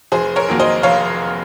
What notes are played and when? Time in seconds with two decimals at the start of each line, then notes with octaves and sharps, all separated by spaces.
0.12 F1 G#4 C5
0.36 A#4 C#5
0.48 F2 D#3 F#3 A#3
0.59 C5 D#5
0.83 F1 C#5 F5